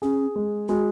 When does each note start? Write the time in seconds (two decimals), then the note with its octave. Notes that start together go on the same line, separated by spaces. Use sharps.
0.02 C#4 G#4
0.36 G#3
0.69 G#3 F#4